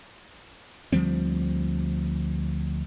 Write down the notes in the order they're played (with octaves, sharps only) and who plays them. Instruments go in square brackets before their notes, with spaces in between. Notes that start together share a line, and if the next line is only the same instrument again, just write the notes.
[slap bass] D2 F3 G3 C4